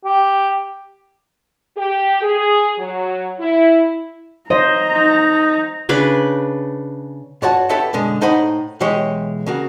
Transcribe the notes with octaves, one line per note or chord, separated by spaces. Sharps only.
G4
G4
G#4
F#3
E4
C5 D#5 A#5
D#4
C#3 D4 B4 B5
G2 F4 F#4 C#5 F#5 A5
E4 G4 A4 B4 E5 F#5
F#2 B2 D3 G#3
A2 D#4 C5 F#5 B5
B1 E3 G#3 G4 C#5
C#3 A#3 F#4